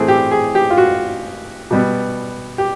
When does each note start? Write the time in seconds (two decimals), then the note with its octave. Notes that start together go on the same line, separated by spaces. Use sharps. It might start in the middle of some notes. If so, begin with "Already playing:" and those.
Already playing: A2 E3 A3 C4 G#4
0.08 G4
0.31 G#4
0.55 G4
0.70 F4
0.78 F#4
1.71 B2 G3 B3
2.58 G4